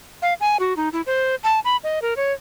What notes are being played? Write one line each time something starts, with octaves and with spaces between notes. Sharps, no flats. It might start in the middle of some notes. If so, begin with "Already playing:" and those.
F5
G#5
F#4
D#4
E4
C5
A5
B5
D#5
A#4
C#5